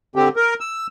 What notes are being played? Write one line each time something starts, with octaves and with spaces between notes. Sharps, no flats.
D3 C4 G4
A#4
E6